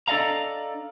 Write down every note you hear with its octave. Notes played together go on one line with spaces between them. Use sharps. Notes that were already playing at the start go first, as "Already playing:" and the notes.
D4 A4 D5 D#5 F5 A#5